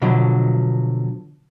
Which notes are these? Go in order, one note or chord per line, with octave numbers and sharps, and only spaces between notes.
B2 D3 F3 F#3